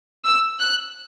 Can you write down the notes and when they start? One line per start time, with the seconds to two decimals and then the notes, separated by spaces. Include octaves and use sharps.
0.25 E6
0.60 F#6